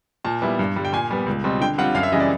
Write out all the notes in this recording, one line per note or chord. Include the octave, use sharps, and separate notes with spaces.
A#2 A5
G3 B3 E4
G2
D3 G3
G5
A#2 G#5
G3 B3
C#2
B2 G3 C4
D3 G5
G3 C4 F4 F#5
F#2 F5
E5
C#3 E3 G3 D#5
D5